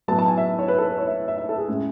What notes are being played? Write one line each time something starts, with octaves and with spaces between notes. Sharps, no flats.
A2 F#3 B3 A5
A5
G#5
E5
C#5
B4
A4
B4
C#5
E5
E5
E5
A4
G#4
A2 G#3 C#4